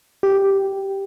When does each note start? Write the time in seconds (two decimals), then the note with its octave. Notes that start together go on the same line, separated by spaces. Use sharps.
0.23 G4